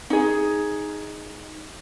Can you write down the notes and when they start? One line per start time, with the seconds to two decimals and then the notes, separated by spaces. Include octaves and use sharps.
0.10 D#4 G#4